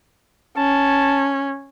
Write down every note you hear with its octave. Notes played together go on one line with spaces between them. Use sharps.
C#4 A5